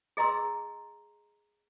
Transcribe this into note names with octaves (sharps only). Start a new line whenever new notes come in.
G#4 D#5 A#5 C6 E6